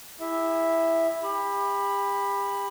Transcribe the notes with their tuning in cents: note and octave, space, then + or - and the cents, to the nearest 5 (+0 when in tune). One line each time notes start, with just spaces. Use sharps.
E4 +0 G#4 -45 E5 +0
G4 +35 B5 +0